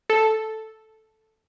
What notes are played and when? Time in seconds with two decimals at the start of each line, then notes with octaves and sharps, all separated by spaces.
0.10 A4